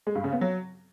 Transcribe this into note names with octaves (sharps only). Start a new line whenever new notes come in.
G#3
G2
C#3
B3
F#3